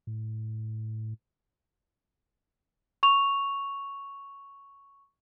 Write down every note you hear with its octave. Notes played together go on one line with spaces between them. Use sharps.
A2
C#6 F7